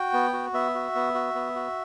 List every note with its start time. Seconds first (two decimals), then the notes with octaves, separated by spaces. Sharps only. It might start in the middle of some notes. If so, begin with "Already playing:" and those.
Already playing: F#4 G5
0.13 B3
0.33 F#4
0.53 B3 E5
0.75 F#4
0.95 B3
1.14 F#4
1.35 B3
1.55 F#4